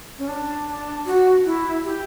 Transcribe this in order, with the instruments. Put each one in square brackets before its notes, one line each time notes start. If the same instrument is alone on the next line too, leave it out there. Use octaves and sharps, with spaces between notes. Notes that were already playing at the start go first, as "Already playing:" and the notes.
[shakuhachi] C#4
D4
D4
F#4
E4
G4